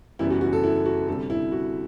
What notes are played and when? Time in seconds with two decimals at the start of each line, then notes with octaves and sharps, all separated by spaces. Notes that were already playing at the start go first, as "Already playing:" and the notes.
0.19 F#1 F#2 E3 G3 B3 E4
0.30 F#4
0.41 F#4
0.53 A4
0.64 E4
0.86 F#4
1.08 D2 C3 G3 A4
1.30 E4
1.52 F#4